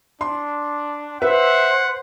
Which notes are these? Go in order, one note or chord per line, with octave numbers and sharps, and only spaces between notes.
D4 C6
B4 C5 E5 F#5